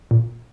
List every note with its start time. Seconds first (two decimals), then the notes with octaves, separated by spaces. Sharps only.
0.11 A#2